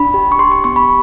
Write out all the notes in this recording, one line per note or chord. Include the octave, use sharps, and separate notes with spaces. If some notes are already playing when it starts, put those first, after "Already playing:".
Already playing: D4 B5
G4
C#6
G4 C6
C#6
B3 C#6
B5